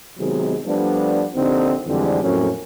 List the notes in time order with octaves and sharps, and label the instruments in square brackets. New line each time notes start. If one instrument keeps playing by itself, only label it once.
[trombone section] C3 D#3 F#3 G#3 B3
F3 G3 A3 B3 D4
A#1 D3 C4 D#4 G4
F2 D3 E3 G3 G#3 C4
F2 A2 F#3 A#3 C#4